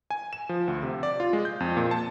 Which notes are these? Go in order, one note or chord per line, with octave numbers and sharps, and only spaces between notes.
G#5
E7
F3
D2
C3
D5
F4
G#3
G6
F2
A#2
A5